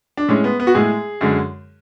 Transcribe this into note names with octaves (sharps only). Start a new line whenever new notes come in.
D4
A2 G#3 C#4
B3
B3
F#4
A2 G#3 G#4
F#2 D3 G#3